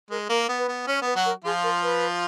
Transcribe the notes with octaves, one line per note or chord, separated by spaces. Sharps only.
G#3 A#4
A#3 A#4
B3
B4
B3
C#4 C#5
B3 B4
F#3 F#4
A#4
F3 F4 G#4
A#4
B4